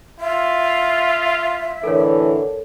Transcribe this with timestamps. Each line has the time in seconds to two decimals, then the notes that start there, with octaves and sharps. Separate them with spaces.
0.20 F4 E5
1.84 A2 D3 E3 A4 A#4 C#5